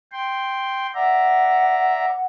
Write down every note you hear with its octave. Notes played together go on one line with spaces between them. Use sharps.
G5 C6
D5 E5 F#5 A#5